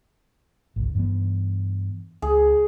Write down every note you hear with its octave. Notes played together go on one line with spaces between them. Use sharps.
G#1 C#2
G2 E3 B3
C#2 G#4